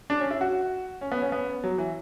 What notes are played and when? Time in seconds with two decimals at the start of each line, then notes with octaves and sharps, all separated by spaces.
0.10 D4
0.20 C#4
0.31 E4
0.41 F#4
1.01 C#4
1.12 B3
1.22 C#4
1.32 B3
1.64 F#3
1.78 E3